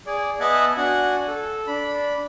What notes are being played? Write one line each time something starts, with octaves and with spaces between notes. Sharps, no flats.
G#4 D5
B3 D#5 E5 F#5 G#5 A5
D4 F#4 F#5 G#5
A4
D4 B5